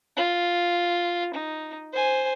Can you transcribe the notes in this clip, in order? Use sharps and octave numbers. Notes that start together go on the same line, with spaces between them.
F4
D#4
C5 G#5